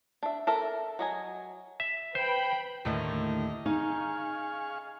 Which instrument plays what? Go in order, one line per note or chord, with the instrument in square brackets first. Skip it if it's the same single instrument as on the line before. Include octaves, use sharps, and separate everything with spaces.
[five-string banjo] D4 E5
A4 A#4 E5
F#3 D#5 G#5
[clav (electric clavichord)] E5
[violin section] B4 G5 B5 [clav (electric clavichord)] C5
[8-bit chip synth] D#2 D#5 [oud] A2 D3 D#3
[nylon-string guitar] D#4 [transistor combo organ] G#4 F5 C#6